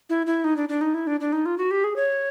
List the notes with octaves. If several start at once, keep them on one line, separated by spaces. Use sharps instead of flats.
E4
E4
D#4
D4
D4
D#4
E4
D4
D4
D#4
F4
F#4
G4
G#4
C#5